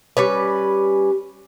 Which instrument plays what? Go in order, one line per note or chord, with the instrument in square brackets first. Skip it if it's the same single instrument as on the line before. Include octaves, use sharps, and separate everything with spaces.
[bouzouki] G3 C#4 B4